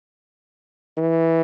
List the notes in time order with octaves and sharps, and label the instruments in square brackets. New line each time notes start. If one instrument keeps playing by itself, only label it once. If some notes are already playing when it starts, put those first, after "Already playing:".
[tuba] E3